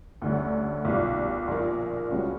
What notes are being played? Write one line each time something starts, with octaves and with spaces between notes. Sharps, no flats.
D2 D3 G3 C#4
B1 A#2 G3
A#1 A#2 A#3
C#2 C#3 G3 C#4 F#4